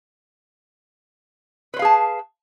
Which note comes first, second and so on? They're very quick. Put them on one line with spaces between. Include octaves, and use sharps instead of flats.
B4 C5 F5 G#4 A5